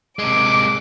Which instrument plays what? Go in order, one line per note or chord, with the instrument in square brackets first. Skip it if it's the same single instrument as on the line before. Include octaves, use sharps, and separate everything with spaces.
[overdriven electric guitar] C3 G#3 [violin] D6